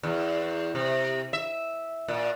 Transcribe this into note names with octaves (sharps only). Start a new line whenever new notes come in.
E2
C3
E5
A#2